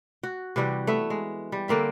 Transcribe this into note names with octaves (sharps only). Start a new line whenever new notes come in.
F#4
C3 E3 G3 F#4
A3 B3 E5
G#3
G3
D3 A#3 C4 E5